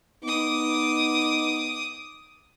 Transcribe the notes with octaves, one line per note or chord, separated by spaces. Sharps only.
B3 D#4 D6 D#6